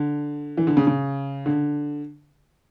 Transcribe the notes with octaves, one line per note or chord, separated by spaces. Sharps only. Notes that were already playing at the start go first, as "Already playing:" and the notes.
Already playing: D3
E3
D3
C#3
C#3
D3